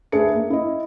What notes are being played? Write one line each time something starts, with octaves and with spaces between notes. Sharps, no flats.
D2 D4 G#4 B4 E5 C#7
A#3
E4 D#5